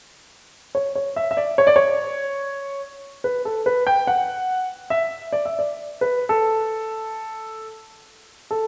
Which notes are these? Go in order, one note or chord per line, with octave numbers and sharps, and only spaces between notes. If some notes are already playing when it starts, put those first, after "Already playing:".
C#5
C#5
E5
E5
D5
C#5
D5
C#5
B4
A4
B4
G5
F#5
E5
D5
E5
D5
B4
A4
A4